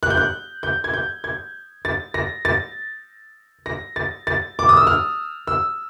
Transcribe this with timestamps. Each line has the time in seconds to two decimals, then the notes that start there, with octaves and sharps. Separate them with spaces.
0.03 F#6
0.10 G6
0.17 F#6
0.63 G6
0.84 G#6
0.93 G6
1.24 G#6
1.85 A6
2.14 A#6
2.45 A6
3.66 A#6
3.96 A6
4.27 A6
4.59 D6
4.69 D#6
4.77 E6
4.87 F6
5.47 E6